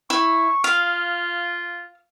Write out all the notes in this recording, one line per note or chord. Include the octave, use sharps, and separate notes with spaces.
E4 C#6
F4 F5